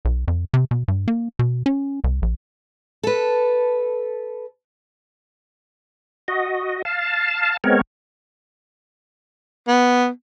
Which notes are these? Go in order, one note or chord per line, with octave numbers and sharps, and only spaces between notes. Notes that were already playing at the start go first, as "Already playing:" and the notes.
B1
F2
C3
B2
G2
A#3
B2
C#4
C2
A#1
A4 B4
F#4 D#5
F5 A5
G#3 B3 C4 A#4 C#5
B3